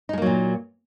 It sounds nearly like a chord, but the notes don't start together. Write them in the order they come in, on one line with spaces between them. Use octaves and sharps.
D#4 G#3 A#3 F#3 A#2